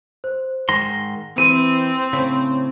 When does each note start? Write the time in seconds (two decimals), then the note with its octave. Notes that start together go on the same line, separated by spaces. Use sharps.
0.24 C5
0.69 G#2 D#3 C6 A#6
1.38 E3 C4 D#7
2.13 A2 C#3